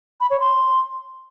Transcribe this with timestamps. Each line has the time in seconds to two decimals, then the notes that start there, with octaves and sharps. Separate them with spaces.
0.20 B5
0.30 C#5
0.40 C6